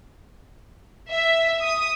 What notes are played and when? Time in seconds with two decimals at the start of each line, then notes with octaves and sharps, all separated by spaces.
1.09 E5
1.64 D#6